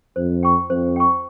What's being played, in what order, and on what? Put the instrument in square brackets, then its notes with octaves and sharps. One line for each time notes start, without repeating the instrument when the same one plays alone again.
[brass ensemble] F2 [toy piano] C5
[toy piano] G5 C#6
[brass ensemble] F2 [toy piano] C5
[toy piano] G5 C#6